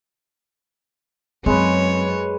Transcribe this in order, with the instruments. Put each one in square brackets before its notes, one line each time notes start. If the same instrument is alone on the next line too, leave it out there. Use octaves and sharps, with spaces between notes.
[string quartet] F#2 [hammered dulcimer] G#3 B4 [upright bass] C4 [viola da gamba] C#5